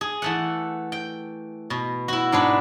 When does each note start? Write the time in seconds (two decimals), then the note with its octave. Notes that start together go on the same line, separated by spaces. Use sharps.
0.01 G#4
0.22 E3 A3 F#5
0.92 G5
1.70 B2
2.08 E4 F#4
2.32 G#2 D4 G#4 B4